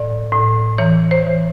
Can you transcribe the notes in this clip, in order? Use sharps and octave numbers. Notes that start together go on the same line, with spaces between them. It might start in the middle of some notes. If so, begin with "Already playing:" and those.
Already playing: A2 D5
A2
E3 C#5
C5
E3